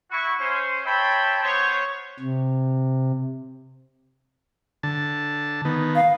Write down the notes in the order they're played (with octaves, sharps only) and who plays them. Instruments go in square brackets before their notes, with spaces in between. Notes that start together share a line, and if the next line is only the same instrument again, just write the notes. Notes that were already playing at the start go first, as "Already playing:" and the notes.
[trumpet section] E4 F#4 C#6
C#4 C5
C5 C#5 E5 G5 A5 B5
B3 C5 C#5
[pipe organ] C3
[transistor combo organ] D3 A5
D#3 B3
[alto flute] F5